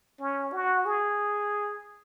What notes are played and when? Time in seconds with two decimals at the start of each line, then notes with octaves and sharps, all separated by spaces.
0.20 C#4
0.53 F#4
0.86 G#4